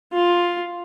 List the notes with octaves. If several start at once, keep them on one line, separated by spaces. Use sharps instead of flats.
F4